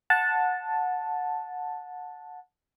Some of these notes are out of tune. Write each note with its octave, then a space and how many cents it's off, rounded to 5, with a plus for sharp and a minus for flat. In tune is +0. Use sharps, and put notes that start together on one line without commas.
F#5 -20 A5 +0